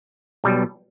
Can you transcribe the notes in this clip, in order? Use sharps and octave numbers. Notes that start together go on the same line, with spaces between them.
B1 B2 G3